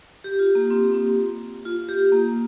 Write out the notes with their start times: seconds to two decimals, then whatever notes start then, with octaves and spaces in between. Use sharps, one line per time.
0.24 G4
0.39 F4
0.55 A#3
0.71 C4
0.94 C4
1.65 F4
1.89 G4
2.12 A#3